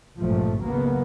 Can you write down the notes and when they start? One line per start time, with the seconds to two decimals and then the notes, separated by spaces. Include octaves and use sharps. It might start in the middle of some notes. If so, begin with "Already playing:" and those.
0.18 G#1 C#2 G2 A#2 F3 A3
0.62 C#3 F#3 A#3 B3